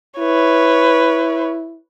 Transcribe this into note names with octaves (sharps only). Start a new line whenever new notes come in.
E4 B4 C#5